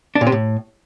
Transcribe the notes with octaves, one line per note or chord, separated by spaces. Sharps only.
D4
A#2
C3
A2